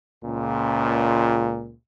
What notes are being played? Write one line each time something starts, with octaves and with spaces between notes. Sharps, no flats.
C#2 A#2